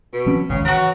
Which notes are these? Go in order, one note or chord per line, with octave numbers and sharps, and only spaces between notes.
B2
F3 C4 C#4
G#1 C#2 C#3
E3 F#3 F#4 A#5